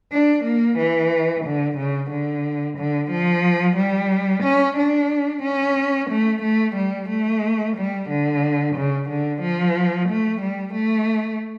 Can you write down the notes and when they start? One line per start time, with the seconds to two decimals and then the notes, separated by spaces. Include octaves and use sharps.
0.12 D4
0.45 A#3
0.78 E3
1.45 D3
1.77 C#3
2.10 D3
2.78 D3
3.11 F3
3.77 G3
4.43 C#4
4.77 D4
5.43 C#4
6.10 A3
6.43 A3
6.76 G3
7.09 A3
7.76 G3
8.10 D3
8.76 C#3
9.09 D3
9.42 F3
10.09 A3
10.42 G3
10.74 A3